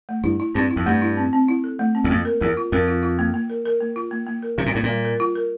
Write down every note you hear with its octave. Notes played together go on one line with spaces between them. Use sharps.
A3
G2 E4
E4
G2 C4
E4
F2
G2 A3
E4
C4
C4
E4
A4
A3
C4
E2
F2 A#3
A#4
E2 A#4
F4
F2 A#4
F4
F4
A#3
A#3
A#4
A#4
A#3
F4
A#3
A#3
A#4
C3 G3
A#2
A2 A#3
A#2
G3
A#4
F4
A#4